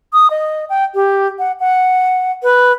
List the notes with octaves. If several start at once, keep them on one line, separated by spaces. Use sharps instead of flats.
D#6
D#5
G5
G4
F#5
F#5
B4